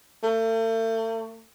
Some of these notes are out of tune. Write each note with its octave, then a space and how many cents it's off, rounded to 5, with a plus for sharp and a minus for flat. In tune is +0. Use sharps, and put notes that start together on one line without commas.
A3 +40